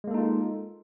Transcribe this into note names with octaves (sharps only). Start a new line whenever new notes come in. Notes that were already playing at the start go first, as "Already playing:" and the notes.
G#3 A#3 D#4 F4 A4